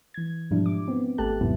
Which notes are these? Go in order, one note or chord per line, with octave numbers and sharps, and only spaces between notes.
E3 G#6
G#2 B2 F3 G3 D4 E4
D6
B3 C4
G#1 A3 G4 A4 A5 F#6
E2 G#2 C3 F#3 B3 E4